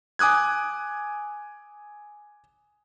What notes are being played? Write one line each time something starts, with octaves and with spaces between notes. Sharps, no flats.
G#5 D6 D#6 F#6 G#6